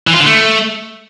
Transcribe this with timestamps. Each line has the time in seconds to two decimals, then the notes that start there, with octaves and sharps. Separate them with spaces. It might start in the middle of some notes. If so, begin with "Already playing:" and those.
0.07 E3
0.13 F4
0.20 D3
0.26 A3